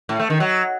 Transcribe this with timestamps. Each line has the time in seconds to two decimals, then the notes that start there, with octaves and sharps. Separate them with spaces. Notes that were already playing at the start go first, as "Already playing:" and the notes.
0.09 A2
0.19 A3
0.30 D#3
0.40 F#3